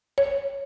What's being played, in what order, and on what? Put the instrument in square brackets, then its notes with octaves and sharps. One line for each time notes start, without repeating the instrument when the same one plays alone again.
[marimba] C#5